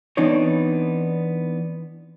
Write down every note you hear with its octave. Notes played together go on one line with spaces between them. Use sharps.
E3 B3 C4 D4 D#4 C#5